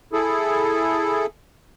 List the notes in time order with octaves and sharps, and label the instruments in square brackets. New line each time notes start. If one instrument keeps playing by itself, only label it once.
[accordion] E4 G#4 A4